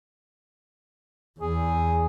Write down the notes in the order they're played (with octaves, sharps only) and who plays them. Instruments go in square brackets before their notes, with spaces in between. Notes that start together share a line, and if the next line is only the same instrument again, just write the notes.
[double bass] E2 [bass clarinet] G#4